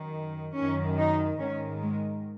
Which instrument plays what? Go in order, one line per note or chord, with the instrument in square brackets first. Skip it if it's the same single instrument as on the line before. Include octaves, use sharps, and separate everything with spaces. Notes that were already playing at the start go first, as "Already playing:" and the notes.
Already playing: [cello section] F#2 D#3
F#2 D#3 C#4
D#4
G#2 D#3 C#4
G#3